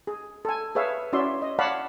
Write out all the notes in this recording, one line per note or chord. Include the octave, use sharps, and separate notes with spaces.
G#4
A4 G#5
G#4 B4 C#5 E5 F5
C#4 E4 F#4 D5 E5 C6
D#5
C#5 D5 F5 F#5 A5 B5